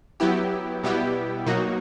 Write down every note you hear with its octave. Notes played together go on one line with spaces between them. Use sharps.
F#3 B3 E4 G4
B2 G3 B3 E4 G4
B2 F#3 A#3 D#4 F#4